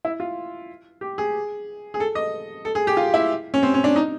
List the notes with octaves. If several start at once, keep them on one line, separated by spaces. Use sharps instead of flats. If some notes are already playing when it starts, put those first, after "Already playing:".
E4
F4
G4
G#4
G#4
A4
D#5
A4
G#4
G4
F4
E4
C#4
C4
C#4
D4
D#4